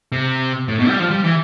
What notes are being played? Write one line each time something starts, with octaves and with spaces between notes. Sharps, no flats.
C3
A2
B2
G3
F3
G3
E3